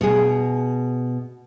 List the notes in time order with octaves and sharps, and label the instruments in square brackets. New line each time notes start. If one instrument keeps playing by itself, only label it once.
[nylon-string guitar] B2 G#4